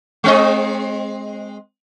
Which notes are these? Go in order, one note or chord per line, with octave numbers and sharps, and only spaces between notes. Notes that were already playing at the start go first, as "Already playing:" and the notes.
G#3 C4 D#5